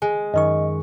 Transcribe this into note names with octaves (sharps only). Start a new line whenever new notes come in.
G#3 G#5
F#2 D#3 D#5 C#6